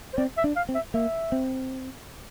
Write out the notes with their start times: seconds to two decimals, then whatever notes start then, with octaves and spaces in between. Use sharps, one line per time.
0.13 C5
0.18 C4 D5
0.37 E5
0.44 D4
0.56 F5
0.69 C4
0.75 E5
0.94 A#3 E5
1.32 C4